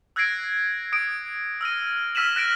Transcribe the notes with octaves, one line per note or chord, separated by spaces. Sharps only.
E6 F#6 G#6 A#6 C7 D7
D#6 D7
E6 F6 A#6 D#7
E6 F6 B6 D#7 E7 F#7
F#6 A#6 D7 E7 F#7